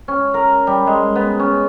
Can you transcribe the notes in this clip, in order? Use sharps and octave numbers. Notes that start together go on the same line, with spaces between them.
C#4
A#4
G3
G#3
B3
C#4